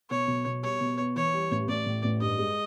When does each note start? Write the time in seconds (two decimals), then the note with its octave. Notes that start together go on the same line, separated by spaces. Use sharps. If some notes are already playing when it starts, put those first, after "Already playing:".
0.10 B2 C#5
0.28 B1
0.46 B2
0.62 G3 C#5
0.81 B2
0.98 B3
1.16 E3 C#5
1.34 G3
1.51 A1
1.68 A1 D5
1.86 A2
2.04 A1
2.21 G2 D#5
2.38 G#3